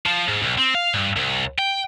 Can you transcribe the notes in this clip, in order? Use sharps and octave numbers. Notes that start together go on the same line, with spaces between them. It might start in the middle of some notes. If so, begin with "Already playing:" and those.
F3
G#2
B1
C4
F5
G2
C2
G5